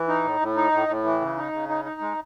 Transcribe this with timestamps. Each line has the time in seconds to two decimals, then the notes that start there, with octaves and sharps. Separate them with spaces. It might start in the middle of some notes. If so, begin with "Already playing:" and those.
Already playing: E3
0.08 D#4
0.23 A2
0.40 A2
0.56 D#4
0.72 A2
0.88 A2
1.04 E3
1.21 C#3
1.37 D#4
1.53 C#3
1.69 D#4
1.85 D#4
2.01 G#3